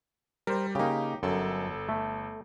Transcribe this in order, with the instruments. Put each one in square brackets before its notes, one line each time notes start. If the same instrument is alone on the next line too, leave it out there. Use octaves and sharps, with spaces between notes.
[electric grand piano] G3 [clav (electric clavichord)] A#4 C5
[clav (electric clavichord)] C#3 A#3 [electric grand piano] D#4 G4
[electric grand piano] G1 A4 [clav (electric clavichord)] F#2
[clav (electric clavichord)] A3